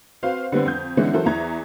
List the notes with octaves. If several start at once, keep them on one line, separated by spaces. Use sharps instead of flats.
C4 F#4 B4 C5 F5
D3 G3 B3 C4 B4 C5
F2 G6
D3 E3 G#3 B3 C#4
E3 F#3 A4 A#4 C5
E2 E3 A#5 G#6